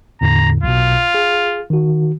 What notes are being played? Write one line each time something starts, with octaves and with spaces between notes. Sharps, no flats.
E2 A2 D3 A#5
B1 B2 F4
G#4
D#3 F#4